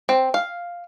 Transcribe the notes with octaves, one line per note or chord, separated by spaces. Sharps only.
C4
F5